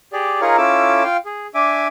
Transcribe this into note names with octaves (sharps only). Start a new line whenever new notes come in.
G4 G#4 D5
D#4 F4 G#4 A#4 C#5
C#4 E4 F4 A4 D6 E6
F4 F5 G5
G#4
D4 E5 G#5 D6